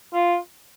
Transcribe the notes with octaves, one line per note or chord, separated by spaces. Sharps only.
F4